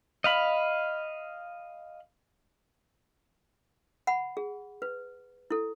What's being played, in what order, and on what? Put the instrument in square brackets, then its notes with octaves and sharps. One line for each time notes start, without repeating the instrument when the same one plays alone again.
[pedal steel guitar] D#5 F5 B5
[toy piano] F#5 B5
G#4
B4
E4 A4